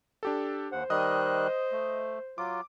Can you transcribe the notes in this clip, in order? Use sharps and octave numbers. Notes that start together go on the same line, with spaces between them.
D4 G4 A4
D#2 C5 F#5
D#3 G3 D#5 D#6 F#6
A3
F#3 F4 D6